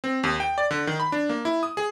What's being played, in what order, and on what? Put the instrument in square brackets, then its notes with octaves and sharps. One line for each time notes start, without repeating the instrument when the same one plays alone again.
[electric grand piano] C4
D#2
G5
D5
D3
D#3
B5
D4
A#3
E4
D#6
G#4